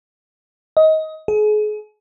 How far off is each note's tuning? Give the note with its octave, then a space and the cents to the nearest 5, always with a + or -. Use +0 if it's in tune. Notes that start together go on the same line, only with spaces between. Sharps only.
D#5 +20
G#4 +35